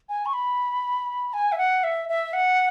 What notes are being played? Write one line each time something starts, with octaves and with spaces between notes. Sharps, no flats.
G#5
C#6
B5
G#5
E5
F#5
E5
E5
F#5